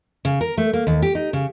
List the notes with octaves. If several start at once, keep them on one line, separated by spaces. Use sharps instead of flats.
C#3
A#4
A3
A#3
D#2
G4
D#4
C#3